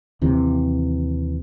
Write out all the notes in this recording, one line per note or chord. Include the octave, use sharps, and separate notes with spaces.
D#2 C3 E3